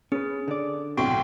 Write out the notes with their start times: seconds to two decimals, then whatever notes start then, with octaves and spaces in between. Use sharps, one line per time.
0.12 C#4 G#4 B4
0.48 D3 D5
0.97 B1 A2 C3 F#4 G5 C6